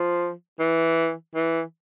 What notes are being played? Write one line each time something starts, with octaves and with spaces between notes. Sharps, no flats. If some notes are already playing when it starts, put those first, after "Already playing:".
Already playing: F3
E3
E3